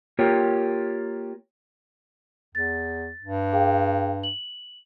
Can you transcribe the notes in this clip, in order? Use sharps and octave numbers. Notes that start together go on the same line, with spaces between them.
A#3 F4 G4 A#4 C#5
E2 A6
G2
G#4 F5 G5
F#7